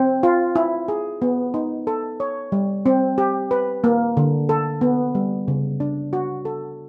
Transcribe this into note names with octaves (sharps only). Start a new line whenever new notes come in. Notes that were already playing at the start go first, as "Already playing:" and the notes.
Already playing: C4
F4
E4
G#4
B3
D#4
A4
C#5
G3
C4
G4
B4
A#3
D3
A4
B3
G3
C#3
D4
F#4
A4